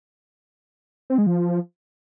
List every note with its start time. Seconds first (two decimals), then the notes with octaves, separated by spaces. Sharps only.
1.10 C4
1.18 G#3
1.27 F3